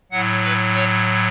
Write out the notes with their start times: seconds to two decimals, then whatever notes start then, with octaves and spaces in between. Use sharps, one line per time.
0.11 A2 F#3 F#5
0.43 B4
0.75 C#5